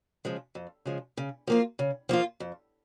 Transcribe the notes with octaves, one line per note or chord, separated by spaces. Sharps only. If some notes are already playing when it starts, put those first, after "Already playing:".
C#3 F3 G#3
F2
C#3 F3 G#3
C#3
F3 A#3 F4
C#3
F3 A#3 F4
F2